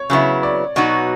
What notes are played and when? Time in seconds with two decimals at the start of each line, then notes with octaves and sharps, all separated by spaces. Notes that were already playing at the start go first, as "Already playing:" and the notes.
Already playing: C#5
0.10 C#3 F#3 B3 E4
0.43 D5
0.76 B2 F#3 B3 D#4 F#4